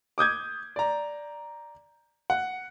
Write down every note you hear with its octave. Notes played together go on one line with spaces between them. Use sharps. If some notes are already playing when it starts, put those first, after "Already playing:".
D6 D#6 G6 G#6
D5 A#5
F#5